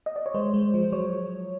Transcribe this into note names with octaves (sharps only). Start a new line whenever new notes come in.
D#5
D5
C#5
G#3 C5
G#3
F3
F#3 C#5